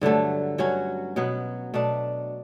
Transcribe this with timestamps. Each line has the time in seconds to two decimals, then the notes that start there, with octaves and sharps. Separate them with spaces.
0.01 G2 D3 F#3 A3
0.58 G2 F#3 C#4 F#4
1.16 B2 F#3 B3
1.74 B2 A3 D4